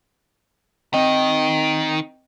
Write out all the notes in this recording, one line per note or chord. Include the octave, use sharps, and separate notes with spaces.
D#3 C4 D#5 G5